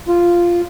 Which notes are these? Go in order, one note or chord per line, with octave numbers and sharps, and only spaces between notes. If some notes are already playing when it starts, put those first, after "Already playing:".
F4